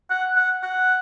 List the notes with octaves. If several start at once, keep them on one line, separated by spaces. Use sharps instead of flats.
F#5
F#5
F#5